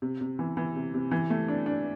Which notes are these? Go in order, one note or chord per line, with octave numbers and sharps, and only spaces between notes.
C3
C3
E3
E3
C3
C3
E3
A3
D4
D4